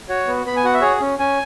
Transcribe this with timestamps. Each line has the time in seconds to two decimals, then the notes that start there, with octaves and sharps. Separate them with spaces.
0.09 F#4 C#5
0.27 B3
0.46 B3 B5
0.57 G#5
0.64 F#4 F#5
0.74 E5
0.82 G#4 C#5
1.01 C#4
1.19 C#4 G#5